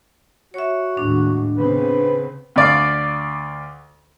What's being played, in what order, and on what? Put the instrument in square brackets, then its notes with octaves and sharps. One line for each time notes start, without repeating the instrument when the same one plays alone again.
[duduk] F#4 [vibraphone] C#5 E5
[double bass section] D#2 A2 G#3 [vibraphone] D4
[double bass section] C#3 B3 C4 [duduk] B4
[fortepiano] D2 D5 F5